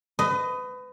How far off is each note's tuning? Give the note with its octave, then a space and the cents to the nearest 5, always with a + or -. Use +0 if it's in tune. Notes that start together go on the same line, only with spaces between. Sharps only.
B4 +30 D#5 +0